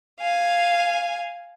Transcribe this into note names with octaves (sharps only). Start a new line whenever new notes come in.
F5 G#5